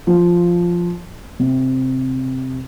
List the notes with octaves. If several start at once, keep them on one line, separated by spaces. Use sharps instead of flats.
F3
C3